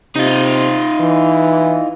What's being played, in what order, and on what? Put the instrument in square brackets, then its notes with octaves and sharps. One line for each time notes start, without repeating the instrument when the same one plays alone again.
[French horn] C3 [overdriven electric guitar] D#4 F4
[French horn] E3